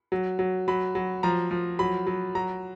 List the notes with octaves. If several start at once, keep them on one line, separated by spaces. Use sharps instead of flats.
F#3
F#3
F#3 B5
F#3
F3 A#5
F3
F#3 B5
F#3
F#3 A#5